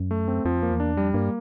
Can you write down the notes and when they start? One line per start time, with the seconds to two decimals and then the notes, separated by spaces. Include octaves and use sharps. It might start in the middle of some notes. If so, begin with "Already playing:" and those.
Already playing: F#2
0.11 A3
0.28 C4
0.45 F2 F3
0.62 A#3
0.71 E2
0.80 D4
0.97 F2 G3
1.14 G2 A#3